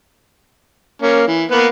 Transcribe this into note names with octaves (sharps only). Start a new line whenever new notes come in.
A#3 C#4
E3
A#3 B3 B4